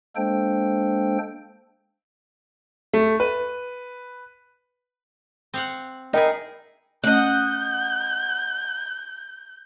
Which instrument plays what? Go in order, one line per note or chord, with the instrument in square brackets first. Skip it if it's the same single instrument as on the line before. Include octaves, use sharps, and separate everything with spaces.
[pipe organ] G#3 A#3 D4 A4 C5 G5
[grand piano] A3
B4
[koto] C4 F5 F#5
[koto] D#4 E4 G#4 [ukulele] A#4 D#5 G5
[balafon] A3 C#4 [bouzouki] D#5 F#5 [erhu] G6